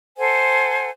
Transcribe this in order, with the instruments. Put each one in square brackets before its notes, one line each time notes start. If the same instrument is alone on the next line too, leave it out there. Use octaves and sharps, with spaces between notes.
[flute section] A4 C5 F#5 G#5